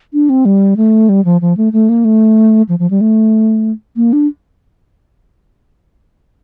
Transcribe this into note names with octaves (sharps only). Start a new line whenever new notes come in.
D4
C4
G3
A3
G3
F3
F3
A3
A3
A#3
A3
F3
F3
G3
A3
A#3
D4